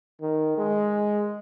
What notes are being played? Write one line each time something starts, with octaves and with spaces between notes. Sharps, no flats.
D#3
G#3